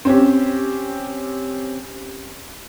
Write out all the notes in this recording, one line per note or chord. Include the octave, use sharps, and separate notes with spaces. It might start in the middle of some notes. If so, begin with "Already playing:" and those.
C4 C#4 G4